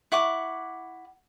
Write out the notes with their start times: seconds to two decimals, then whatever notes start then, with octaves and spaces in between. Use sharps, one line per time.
0.12 E4 F#5 C#6 D6